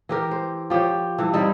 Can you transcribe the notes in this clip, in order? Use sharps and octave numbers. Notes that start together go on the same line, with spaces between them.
E3 G4 A#4
C5
F3 G4 C5 C#5
G2 E3
G3 C4 D#4 E4